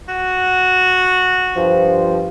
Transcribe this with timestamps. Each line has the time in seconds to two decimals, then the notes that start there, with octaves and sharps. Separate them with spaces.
0.08 F#4
1.57 G2 F3